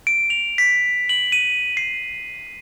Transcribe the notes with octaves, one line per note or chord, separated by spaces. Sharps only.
D7
F7
B6
F#7
D#7
C7